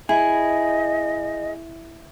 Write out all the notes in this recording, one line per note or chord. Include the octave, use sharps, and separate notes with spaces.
E4 G#4 D#5